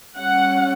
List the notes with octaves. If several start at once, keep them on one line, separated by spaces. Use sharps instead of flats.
G3 C#4 F#5